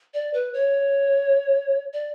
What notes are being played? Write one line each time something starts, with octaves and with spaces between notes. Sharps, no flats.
D5
B4
C#5
D5